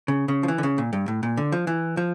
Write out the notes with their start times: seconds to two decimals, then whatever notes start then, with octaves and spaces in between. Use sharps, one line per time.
0.08 C#3
0.28 C#3
0.43 F3
0.48 E3
0.58 D3
0.63 C#3
0.78 A#2
0.93 G2
1.08 A2
1.23 A#2
1.37 D3
1.52 F3
1.67 E3
1.97 F3